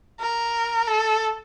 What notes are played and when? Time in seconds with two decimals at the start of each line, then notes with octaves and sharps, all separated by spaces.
0.20 A#4
0.87 A4